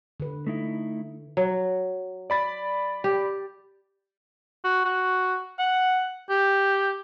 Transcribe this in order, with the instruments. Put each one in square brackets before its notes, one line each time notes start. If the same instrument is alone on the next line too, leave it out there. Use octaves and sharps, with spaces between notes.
[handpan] D3 B4
[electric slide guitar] A3 D#4 E4
[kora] F#3
[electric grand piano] D5 B5 A6
[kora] G4
[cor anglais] F#4
F#4
F#5
G4